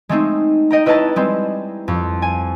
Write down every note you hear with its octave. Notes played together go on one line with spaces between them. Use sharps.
G#3 A3 C4 D#4
D#5 G5 A#5
E4 B4 C#5 D#5 A5 A#5
G3 G#3 C4
F2
G#5